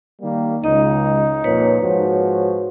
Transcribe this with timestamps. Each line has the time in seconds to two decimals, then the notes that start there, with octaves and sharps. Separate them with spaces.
0.21 D#3 G3 A#3
0.64 C#2 D#4 D#5
1.44 F2 A#2 B4 C#5
1.81 G#2 F3 F#4